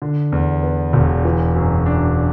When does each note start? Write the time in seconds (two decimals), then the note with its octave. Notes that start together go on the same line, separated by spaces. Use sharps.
0.02 D3
0.32 E2
0.63 B3
0.93 E1
1.25 E3
1.55 F#2
1.86 D4